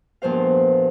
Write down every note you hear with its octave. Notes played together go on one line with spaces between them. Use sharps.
E2 G2 A#2 F3 C5 F5